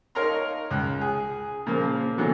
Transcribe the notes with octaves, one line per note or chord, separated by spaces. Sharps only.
D#4 A#4 C#5 F5 A#5 C6
C#2 F#6
G#4
A#2 C#3 F3 A#3
B2 D3 E3 F#3